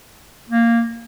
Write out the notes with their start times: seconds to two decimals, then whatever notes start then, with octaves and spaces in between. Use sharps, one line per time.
0.49 A#3